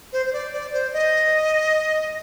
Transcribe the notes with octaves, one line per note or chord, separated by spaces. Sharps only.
C5
C5
D5
D5
C5
D#5